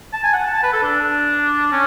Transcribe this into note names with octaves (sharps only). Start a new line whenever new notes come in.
A5
G#5
F#5
A5
A5
B4
A4
D4
C#4